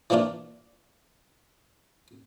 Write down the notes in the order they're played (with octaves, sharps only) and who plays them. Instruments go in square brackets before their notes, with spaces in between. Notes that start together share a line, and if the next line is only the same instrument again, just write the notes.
[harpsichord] E3 F3 A#3 D4 F4